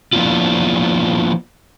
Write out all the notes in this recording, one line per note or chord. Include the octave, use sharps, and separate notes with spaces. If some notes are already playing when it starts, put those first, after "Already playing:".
F3 A#3 B3 D4 E4 F4